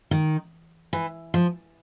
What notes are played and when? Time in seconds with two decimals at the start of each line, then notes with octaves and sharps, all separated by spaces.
0.11 D#3
0.93 E3
1.34 F3